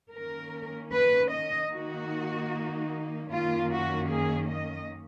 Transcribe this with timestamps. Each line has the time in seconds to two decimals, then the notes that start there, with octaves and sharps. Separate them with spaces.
0.12 D#3 A#3 C#4 A#4
0.93 B4
1.32 D#5
1.72 D#3 A#3 D#4 F#4
3.31 F#2 D#3 A#3 C#4 F4
3.71 F#4
4.11 G#4
4.50 D#5